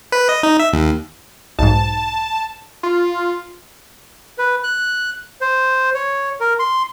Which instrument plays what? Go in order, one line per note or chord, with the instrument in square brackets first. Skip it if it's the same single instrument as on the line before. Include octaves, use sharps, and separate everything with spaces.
[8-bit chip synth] B4
D#5
D#4
E5
D#2
[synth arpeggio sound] B1 G#2 [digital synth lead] A5
[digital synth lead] F4
[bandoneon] B4
F#6
C5
C#5
A#4
C6